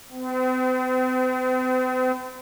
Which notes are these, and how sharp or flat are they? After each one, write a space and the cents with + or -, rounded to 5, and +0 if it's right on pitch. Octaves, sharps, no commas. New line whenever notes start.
C4 -45